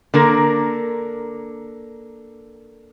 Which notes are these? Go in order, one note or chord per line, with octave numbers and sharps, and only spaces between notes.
D3 A#3 A#4